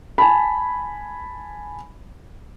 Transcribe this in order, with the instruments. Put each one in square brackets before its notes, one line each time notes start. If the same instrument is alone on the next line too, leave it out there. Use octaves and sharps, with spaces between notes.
[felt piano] G#5 A5 B5